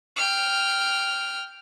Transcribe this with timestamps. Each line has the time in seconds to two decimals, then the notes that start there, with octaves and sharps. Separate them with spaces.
0.16 G5 F6